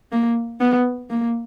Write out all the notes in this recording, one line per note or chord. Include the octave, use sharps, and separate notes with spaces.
A#3
B3
A#3